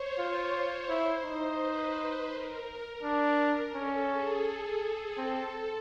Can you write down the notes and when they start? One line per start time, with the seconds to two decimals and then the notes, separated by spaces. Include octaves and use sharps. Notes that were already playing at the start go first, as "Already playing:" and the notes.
Already playing: C5 C#5
0.18 F4 C#5
0.54 C#5
0.89 E4 C5
1.25 D#4
1.61 B4
2.33 A#4
3.03 D4
3.75 C#4 A4
4.10 G#4
4.47 G#4
5.17 C4 A4